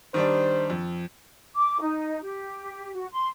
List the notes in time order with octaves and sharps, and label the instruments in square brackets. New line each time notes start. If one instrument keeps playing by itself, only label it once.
[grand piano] D#3 G3 D4 [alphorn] C5
[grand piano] F2
[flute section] D6
D#4
G4
F#4
C6